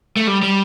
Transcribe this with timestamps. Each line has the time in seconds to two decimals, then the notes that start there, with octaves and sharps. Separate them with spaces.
0.16 A3
0.27 G3
0.42 G3